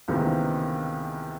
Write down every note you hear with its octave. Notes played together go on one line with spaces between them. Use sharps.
C#2 C3 D#3 E3 A#3 B3